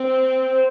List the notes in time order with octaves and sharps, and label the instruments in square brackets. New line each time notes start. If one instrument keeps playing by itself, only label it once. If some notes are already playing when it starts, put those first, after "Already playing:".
Already playing: [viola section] C4
[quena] C5